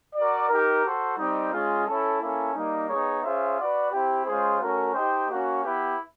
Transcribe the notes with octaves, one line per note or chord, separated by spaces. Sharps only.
F#4 A#4 D5
D#4 G4 A#4
F#4 A4 C5
G3 C4 D#4
G#3 C#4 F4 G#4
C#4 E4 A4
A#3 C#4 E4 A4
G3 A#3 D#4
B3 D#4 G#4 C#5
C#4 F4 G#4 C5 E5
F#4 B4 D5 F#5
C4 E4 G4
G#3 C#4 F4 G#4 C5
A3 C#4 F#4 A#4
D#4 G4 C5 D#5 G5
A#3 C#4 F#4
B3 E4 G4 B4